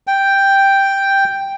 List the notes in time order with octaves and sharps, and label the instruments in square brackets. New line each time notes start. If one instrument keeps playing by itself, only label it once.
[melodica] G5